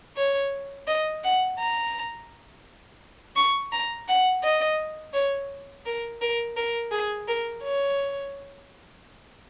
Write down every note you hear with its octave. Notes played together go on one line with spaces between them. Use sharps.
C#5
D#5
F#5
A#5
C#6
A#5
F#5
D#5
C#5
A#4
A#4
A#4
G#4
A#4
C#5